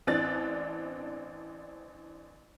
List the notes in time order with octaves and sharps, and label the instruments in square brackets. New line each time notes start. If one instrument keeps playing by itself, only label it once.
[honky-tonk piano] A1 E3 C4 D4 F#6 A6